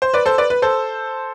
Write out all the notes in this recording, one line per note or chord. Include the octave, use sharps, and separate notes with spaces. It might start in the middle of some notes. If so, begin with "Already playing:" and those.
C5
B4 D5
A4 C5
B4 D5
B4
A4 C5